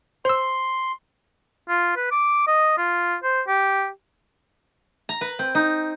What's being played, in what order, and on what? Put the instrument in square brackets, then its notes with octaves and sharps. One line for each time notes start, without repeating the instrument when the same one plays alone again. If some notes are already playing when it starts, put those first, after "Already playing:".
[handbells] C5 E6 [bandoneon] C6
[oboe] F4
B4
D6
D#5
F4
C5
G4
[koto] A#5
B4
C4
D#4